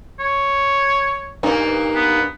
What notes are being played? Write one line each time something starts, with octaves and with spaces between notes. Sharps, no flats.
C#5
G2 A#3 D#4
B3